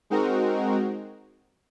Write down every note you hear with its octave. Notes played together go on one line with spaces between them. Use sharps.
G#3 C4 D#4 F#4 A#4